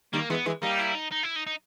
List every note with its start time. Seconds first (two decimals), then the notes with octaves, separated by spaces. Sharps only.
0.13 D#3 G3 A#3
0.30 E3 G#3 B3
0.46 E3 G#3
0.62 G3 A#3 D#4
0.79 E4
0.95 D#4
1.11 D#4
1.23 E4
1.36 D#4
1.47 D#4